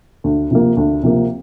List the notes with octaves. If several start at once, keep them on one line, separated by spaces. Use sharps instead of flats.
D2
C3 F3 A#3
D2
C3 F3 A#3